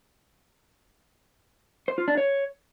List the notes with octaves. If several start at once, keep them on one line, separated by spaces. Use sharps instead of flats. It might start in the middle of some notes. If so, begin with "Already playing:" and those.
C5
F4
D4
C#5